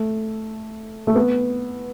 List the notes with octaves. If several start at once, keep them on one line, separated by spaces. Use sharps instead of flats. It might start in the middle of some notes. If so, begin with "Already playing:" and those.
Already playing: A3
A3
B3